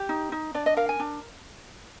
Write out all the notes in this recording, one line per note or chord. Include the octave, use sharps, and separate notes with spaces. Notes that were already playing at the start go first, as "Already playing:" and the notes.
Already playing: G4
D#4
D#4
D4 D5
D#5
A#4 F5
G#5
D4